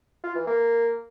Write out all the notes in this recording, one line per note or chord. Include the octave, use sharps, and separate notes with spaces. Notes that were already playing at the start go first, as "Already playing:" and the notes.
F4
E3
A#3